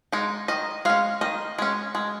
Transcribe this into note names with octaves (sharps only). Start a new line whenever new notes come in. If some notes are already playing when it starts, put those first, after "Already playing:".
G#3 D#4
D#3 D#5
G#3 C#4 F5
D#3 D#5
G#3 C#4
G#3